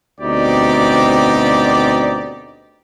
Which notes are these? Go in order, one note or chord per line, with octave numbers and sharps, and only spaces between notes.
D2 B2 C4 D#4 G4 D5